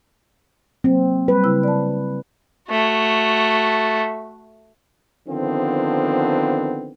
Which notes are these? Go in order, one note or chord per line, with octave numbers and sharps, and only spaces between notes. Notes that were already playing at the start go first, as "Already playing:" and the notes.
F#3 A#3 C4
G3 B4
C#3 E4 E6
D5 A5
A3 F#4
D3 D#3 F3 B3 C4